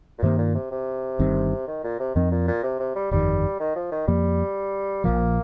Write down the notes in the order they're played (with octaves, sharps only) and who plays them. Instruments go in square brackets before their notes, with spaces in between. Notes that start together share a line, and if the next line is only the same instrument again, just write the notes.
[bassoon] A#2
[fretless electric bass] G2 D#3 A#3 [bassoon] C3
[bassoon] A#2
C3
C3
[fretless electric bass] G1 G2 D#3 C4
[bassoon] D#3
A#2
C3
[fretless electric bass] F2 F3 C4 [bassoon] D#3
[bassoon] A#2
A#2
C3
C3
G3
[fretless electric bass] G1 F2 D#3 [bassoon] G3
[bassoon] D#3
F3
D#3
[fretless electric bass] F2 F3 A#3 [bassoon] G3
[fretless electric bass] A#1 A#2 F3 [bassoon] A#3